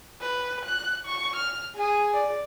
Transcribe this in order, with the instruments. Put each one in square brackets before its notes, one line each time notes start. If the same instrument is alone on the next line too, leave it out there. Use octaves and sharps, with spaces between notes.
[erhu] B4
F#6
C#6
F6
[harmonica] G#4 [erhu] G#5
[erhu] D5